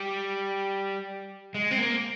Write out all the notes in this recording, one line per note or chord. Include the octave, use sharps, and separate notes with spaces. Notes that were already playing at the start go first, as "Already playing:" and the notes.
Already playing: G3
G#3
C4
A#3